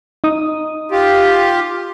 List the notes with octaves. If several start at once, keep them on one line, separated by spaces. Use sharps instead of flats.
D#4 D#6
F4 G4